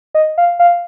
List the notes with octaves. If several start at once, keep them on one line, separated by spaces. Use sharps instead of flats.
D#5
F5
F5